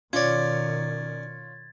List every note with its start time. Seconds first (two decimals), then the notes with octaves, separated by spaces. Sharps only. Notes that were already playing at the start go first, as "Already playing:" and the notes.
0.13 B2 D#3 C#4 F4 C#5 D5 G#6 A6